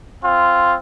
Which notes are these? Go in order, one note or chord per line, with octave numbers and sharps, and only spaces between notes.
C4 F4